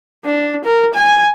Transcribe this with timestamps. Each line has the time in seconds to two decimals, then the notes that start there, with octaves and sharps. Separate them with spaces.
0.25 D4
0.65 A#4
0.94 G#5